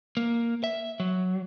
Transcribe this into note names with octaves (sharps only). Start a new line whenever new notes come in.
A#3
E5
F#3